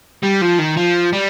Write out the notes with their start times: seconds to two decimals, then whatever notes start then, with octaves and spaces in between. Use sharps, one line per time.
0.23 G3
0.41 F3
0.59 D#3
0.77 F3
1.13 G3